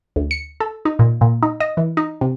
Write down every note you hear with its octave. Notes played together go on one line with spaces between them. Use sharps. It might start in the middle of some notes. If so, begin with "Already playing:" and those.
D2
C#7
A4
D#4
A#2
A#2
D#4
D#5
E3
D#4
C3